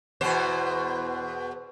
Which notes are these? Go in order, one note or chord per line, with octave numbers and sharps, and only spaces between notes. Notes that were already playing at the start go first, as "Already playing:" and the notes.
E2 B2 C5